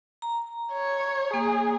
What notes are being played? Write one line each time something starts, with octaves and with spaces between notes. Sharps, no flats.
A#5
C#5
A#3 G#4